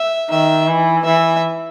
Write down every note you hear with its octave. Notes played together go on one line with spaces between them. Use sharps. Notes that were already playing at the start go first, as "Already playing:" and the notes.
Already playing: E5
D#3 E5
E3
E3 E5